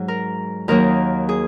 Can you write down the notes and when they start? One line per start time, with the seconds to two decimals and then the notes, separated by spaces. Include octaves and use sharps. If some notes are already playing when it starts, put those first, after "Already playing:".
Already playing: G#2 F#3
0.08 A#4
0.68 D#2 D#3 F#3 A#3 A#4
1.29 G#4